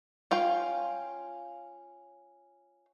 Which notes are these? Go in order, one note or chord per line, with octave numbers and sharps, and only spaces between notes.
C#4 F4 F5 G5